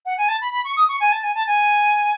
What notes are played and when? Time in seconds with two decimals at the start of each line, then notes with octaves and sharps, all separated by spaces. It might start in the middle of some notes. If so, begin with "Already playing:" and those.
0.06 F#5
0.18 G#5
0.28 A5
0.41 B5
0.52 B5
0.64 C#6
0.77 D#6
0.89 C#6
1.00 G#5
1.12 A5
1.23 G#5
1.35 A5
1.47 G#5